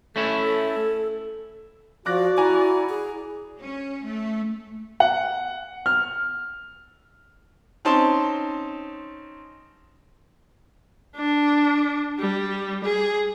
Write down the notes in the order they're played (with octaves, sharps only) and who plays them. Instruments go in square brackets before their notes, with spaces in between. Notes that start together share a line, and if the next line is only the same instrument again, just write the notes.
[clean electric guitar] A3 C#4 E4 [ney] A4
[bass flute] F3 [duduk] F#4 [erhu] D5 [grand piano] D6 F#6 A#6
[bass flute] E4 [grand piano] F#5 G#5 A#5
[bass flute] G#4
[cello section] C#4
A3
[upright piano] F#5
F6
[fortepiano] C4 C#4 D#4 A5 C6
[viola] D4
G3
G#4